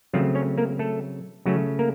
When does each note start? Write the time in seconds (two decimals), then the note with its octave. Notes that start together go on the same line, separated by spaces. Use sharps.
0.13 C#3 F3 F#3 A3 C4 F4
0.35 C#4 C#5
0.58 A#3 A#4
0.79 A3 A4
1.46 C#3 F#3 A3 C#4 F#4
1.79 A#3 A#4